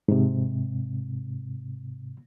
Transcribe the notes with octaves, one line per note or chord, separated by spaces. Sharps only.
G#2 C3